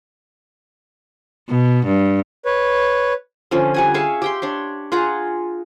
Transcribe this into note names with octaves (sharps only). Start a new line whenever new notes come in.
B2
G2
B4 C#5
D3 F3 C#4
G3 F#5 G#5
G#4 E5 F5 C#6
G4 G5 C6
D4 C#5 C6
F4 G#4 F#5 A#5